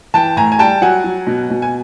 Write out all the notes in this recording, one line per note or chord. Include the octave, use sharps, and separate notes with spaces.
E3 G5 A5
A2 G#5 A#5
G#5
G3 G5 A5
F#3 F#5 G#5
F#3
B2
B2
G#5